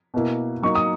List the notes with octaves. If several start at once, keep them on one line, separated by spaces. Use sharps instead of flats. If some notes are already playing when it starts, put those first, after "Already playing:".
B2 A#3 E4
F#3 A#3 D#4 C#6
D#6